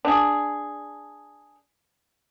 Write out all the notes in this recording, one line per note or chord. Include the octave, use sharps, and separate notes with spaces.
D4 G#4